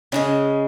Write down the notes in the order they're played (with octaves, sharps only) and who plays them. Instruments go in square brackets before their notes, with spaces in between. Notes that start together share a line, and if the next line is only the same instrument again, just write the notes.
[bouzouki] C#3 E3 G#3 [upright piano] C#4